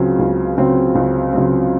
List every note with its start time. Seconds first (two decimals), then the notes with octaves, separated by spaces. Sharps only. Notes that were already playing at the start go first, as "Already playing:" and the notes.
Already playing: C#2 C#3 F#3 C4
0.19 C#2
0.57 C#3 F#3 C4
0.95 C#2
1.33 C#3 F#3 C4